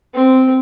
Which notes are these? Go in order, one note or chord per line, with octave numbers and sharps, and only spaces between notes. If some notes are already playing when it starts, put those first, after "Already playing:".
C4